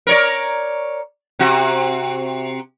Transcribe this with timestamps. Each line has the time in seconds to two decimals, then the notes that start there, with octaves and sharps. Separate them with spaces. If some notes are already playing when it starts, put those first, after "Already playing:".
0.07 A#4 C#5 D5
1.39 C3 F#4